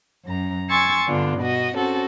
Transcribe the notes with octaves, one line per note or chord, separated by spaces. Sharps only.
F#2 A#5
G#5 C6 C#6 E6 G#6 A6
G2 D3 B3 D4 F4
B2 F#4 D#5
C4 C#4 F#4 A4